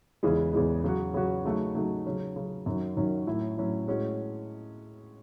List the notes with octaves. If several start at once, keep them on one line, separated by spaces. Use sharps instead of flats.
E2 C#3 E3 G#3
E2 C#3 E3 G#3
C#3 F#3 C#4 F#4
C#3 F#3 C#4 F#4
C#3 F#3 A3 D#4 F#4
C#3 F#3 A3 D#4 F#4
C#3 F#3 C#4
C#3 F#3 C#4
F#2 D#3 F#3 C#4 F#4
F#2 D#3 F#3 C#4 F#4
A2 F#3 C#4 E4
A2 F#3 C#4 E4
A2 G#3 C#4 F#4